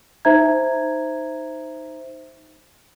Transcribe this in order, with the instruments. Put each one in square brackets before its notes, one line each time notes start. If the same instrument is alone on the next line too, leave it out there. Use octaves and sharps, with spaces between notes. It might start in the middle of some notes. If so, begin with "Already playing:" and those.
[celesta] D#4 C5 E5 A#5 G#6